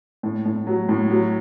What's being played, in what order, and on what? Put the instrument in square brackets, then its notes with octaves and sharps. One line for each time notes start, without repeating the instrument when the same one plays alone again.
[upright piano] A2
A2
F#3
A2
F#3